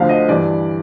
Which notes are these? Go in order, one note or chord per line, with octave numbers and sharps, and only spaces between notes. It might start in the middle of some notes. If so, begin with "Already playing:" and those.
Already playing: D2 D3 F3 F5
D#5
G2 E3 D5